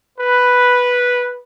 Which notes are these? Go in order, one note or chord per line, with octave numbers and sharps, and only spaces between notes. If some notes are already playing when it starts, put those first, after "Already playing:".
B4